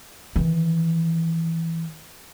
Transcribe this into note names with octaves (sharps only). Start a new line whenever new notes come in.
D#3 E3